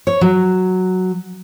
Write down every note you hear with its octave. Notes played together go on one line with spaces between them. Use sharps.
C#5
F#3